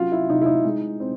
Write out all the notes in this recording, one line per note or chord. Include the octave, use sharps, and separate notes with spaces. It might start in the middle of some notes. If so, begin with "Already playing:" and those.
Already playing: F#3 C#4 F4
E4
C3 D#4
E4
D#4
G#3
C4